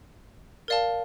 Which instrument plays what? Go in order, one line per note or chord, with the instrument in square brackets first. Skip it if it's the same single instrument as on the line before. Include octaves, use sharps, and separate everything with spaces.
[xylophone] A#4 D5 F5 A5